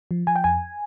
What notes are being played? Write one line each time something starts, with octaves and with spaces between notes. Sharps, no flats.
F3
F3 G#5
G5
F2 G#5